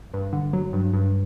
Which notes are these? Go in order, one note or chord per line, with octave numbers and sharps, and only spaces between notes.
G2
D3
F#3
G2
G2